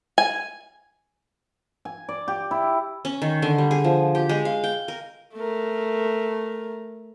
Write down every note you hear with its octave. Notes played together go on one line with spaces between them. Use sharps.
G#5
G#5
D5
G4
E4
C#4
D#3
D3
G3
G#4
F3
G4
G#3
F5
G5
A#4
A3 A#4